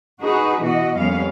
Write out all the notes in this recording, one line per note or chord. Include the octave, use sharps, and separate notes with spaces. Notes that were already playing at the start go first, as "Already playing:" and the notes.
D#4 F#4 G#4 B4
B2 E3 F#4 D#5
F2 G3 A#3 B3 C#4 F5